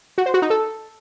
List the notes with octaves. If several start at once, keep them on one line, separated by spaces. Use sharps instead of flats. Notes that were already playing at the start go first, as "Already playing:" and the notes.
F#4
C5
F#4
D#4
A4